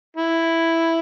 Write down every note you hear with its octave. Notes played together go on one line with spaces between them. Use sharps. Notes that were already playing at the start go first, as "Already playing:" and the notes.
E4